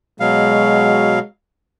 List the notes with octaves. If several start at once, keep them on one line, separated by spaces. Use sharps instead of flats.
B2 F#3 G#3 F5